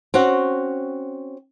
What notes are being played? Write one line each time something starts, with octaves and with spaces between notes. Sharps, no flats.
C4 C#4 F#4